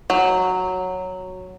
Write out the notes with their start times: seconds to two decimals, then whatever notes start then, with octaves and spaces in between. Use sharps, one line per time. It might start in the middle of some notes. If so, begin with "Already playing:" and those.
0.10 F#3